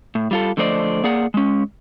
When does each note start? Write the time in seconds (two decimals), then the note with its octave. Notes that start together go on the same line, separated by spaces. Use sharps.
0.15 A2
0.31 G3 F4 A4
0.57 D3 F3 A3 C5 D5 D#5
1.04 A#3 G#4 D5 F#5
1.34 G#3 C#4